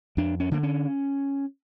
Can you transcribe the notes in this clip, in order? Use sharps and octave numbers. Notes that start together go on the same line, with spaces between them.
F2 D4
C#4
D3 A#3
C#4